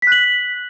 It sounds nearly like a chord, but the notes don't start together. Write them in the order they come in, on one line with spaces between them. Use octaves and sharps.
B6 F#6 F#7